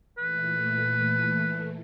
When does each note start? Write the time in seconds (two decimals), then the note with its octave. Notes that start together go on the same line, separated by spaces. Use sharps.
0.18 A#2 E3 A3 B4